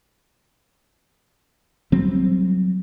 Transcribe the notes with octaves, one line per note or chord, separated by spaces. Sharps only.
F#3 G3 C4